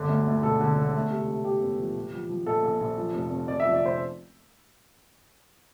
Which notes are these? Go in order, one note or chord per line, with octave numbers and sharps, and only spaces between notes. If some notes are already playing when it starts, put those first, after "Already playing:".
Already playing: G1 D3
D2
D2
E1 A4
D3
E1
A3
C3
C3
C3 G4
E2
F3
A#1
F3
F3
A#1 A4
A#1
A#1
F3
F1
F1
F1 D5
F3 E5
D5
F1 C5